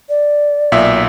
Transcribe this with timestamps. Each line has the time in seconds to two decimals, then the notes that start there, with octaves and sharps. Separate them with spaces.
0.09 D5
0.72 B1 A#2 E5